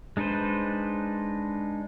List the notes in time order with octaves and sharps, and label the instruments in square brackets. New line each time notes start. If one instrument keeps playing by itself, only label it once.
[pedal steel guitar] G#3 D4 D#4 B4 C5